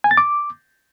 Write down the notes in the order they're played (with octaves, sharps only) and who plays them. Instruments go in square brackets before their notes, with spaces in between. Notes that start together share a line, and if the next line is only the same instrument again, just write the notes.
[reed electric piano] G#5
A6
D6